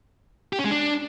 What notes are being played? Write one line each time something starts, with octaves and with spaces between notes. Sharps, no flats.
G4
C#4
G#3
D4